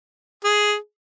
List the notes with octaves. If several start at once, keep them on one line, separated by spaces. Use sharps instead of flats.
G#4